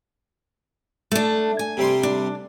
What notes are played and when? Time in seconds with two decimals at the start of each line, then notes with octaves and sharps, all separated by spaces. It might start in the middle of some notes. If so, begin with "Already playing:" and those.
1.12 A3 D4
1.59 G#5
1.77 C3 G3 C6
2.03 D4